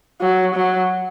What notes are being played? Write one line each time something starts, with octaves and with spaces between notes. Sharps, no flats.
F#3
F#3